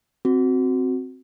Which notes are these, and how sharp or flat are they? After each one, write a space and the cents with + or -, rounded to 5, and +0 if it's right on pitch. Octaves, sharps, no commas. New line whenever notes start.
C4 +0 F#4 -5